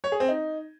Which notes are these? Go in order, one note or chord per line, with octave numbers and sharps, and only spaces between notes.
C#5
G#4
C4
D#4